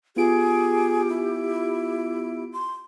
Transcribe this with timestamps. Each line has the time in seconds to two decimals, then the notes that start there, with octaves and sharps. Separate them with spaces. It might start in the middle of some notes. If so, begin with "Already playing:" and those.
0.16 B3 F4 G4 G#4 D7
1.09 E4
2.53 C6